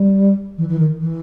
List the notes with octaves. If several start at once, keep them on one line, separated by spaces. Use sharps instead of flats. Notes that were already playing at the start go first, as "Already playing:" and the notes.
Already playing: G3
E3
E3
D#3
E3